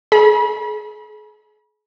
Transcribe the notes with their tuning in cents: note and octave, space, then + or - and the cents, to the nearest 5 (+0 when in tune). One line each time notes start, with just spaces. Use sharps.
G#4 +40 B5 -35